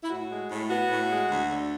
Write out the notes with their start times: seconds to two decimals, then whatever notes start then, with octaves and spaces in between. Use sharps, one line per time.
0.04 E4
0.10 A2 F#4
0.30 G#3
0.50 A2
0.70 B3 F#4
0.90 A2
1.10 G#3
1.30 D2
1.50 D3